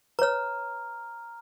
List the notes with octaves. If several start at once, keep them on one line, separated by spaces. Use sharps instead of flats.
B4 C#5 A#5 F6